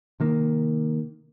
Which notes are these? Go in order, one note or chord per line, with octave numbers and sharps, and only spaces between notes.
C3 D#3 A#3